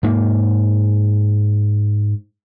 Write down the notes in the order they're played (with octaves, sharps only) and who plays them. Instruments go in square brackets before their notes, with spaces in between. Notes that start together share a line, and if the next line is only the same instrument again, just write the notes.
[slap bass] G#2 A#3